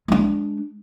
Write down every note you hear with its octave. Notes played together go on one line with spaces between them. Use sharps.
G#3 D4